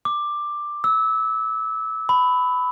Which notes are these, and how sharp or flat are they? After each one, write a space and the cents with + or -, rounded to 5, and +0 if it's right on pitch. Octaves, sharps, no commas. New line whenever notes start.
D6 +10
E6 -25
B5 +15